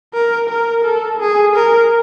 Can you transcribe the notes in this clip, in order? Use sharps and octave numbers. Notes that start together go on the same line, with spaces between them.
A#4
A#4
A4
G#4
A#4